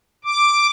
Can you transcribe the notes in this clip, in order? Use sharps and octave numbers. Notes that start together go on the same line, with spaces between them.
D6